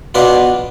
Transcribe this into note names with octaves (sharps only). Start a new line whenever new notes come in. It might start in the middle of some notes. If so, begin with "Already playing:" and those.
B2 B3 D4 F4